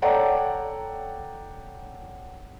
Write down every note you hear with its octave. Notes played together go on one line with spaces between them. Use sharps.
A4 C#5 D5 F#5 G5 A#5